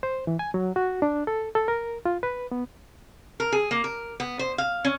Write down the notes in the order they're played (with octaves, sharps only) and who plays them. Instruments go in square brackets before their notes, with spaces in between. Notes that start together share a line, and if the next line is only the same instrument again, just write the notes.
[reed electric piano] C5
E3
G#5
F#3
F#4
D4
A4
A4
A#4
F4
B4
B3
[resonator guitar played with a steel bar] A#4
G#4
A#3
A#4
B3
C5
F5
C#4